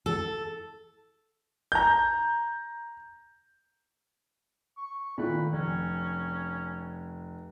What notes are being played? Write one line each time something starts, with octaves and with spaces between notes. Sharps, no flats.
A4
A#5 G6
C#6
A#2 D#3 A3 B4
F1 C#4